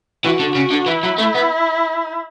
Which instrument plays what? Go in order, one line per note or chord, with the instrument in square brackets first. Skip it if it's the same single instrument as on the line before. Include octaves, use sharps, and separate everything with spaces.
[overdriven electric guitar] E3 [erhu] F#4
[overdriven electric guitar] D3
[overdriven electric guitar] C#3 [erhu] F#4
[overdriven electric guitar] D3
[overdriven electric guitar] E3 [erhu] E4
[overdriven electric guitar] F#3
A3
B3